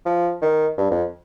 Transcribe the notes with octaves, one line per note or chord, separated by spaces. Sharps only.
F3
D#3
G2
F2